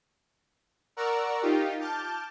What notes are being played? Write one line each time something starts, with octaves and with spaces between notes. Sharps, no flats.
A#4 D5 F#5 A#5 C#6 E6
D#4 F4 G4
A5 D6 F6 G6